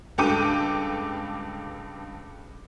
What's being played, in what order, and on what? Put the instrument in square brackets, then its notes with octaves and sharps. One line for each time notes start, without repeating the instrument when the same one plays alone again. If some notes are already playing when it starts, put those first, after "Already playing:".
[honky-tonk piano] C#2 G2 A4 G5 D6 D#7